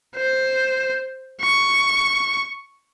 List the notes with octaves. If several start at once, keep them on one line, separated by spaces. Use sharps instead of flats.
C5
C#6